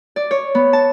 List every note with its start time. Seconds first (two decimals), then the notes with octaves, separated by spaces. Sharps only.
0.16 D5
0.31 C#5
0.55 B3
0.73 A5